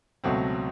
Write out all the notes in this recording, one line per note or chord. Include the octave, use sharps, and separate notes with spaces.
C#2 B2 F#3 A3 C4